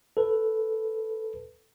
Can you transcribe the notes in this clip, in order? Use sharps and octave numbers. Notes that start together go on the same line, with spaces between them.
A4 B4